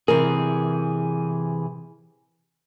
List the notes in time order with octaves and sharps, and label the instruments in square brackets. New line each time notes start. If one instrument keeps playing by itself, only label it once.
[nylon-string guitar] C3 A#4 [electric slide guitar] E3 G#4